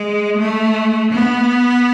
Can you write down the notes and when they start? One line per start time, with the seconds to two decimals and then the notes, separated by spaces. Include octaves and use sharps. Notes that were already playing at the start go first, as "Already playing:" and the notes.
Already playing: G#3
0.38 A3
1.13 B3